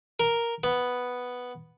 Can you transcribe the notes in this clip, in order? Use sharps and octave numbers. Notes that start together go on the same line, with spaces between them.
A#4
B3